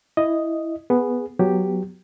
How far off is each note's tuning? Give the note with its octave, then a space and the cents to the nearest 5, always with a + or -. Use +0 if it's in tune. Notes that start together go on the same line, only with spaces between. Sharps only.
E4 +0 D#5 +0
B3 +0 G#4 +0
F#3 +0 B3 +0 G4 +0